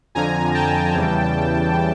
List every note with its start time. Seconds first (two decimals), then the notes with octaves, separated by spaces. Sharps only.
0.15 F2 D3 F3 G#5 A#5
0.54 G5 A5
0.94 E2 C#3 E3 G3